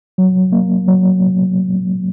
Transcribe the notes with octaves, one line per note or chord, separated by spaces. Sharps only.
F#3
A#3
F#3